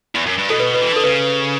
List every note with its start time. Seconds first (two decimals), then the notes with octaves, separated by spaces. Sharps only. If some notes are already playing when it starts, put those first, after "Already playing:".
0.15 E2
0.26 F#2
0.38 G2
0.48 B2 A4
0.60 B4
0.74 B4
0.81 E3
0.92 D3 A4
1.03 C#3 B4